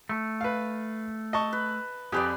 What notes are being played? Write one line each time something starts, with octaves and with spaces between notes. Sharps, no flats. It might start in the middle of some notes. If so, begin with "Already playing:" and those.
A3
B4 F5
D#5 A5 C#6
B4
F2 G4 G#4 B4 D5